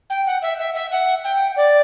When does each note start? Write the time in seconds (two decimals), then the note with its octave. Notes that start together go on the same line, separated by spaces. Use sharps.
0.09 G5
0.26 F#5
0.42 E5
0.58 E5
0.74 E5
0.91 F#5
1.24 G5
1.56 D5